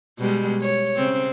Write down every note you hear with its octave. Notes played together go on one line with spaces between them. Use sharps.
B2 G3 G#3
C#5
C#3 C4